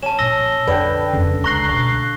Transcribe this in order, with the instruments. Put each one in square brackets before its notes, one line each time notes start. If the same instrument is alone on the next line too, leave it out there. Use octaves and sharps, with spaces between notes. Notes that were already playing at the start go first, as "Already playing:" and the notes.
[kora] C#4 [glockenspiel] A5 E7
[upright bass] A#2 F3 [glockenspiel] E6 A#6 G7
[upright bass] F2 [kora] D3 [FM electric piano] B4 G5
[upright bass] A1 F2 [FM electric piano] C#3
[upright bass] C#2 [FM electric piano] A#5 F#6 C7 [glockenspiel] C#6 A#6 G7
[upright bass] B2 A3 [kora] F5